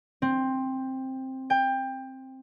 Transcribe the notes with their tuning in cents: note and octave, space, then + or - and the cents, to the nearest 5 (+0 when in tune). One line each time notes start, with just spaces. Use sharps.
C4 +10
G5 +20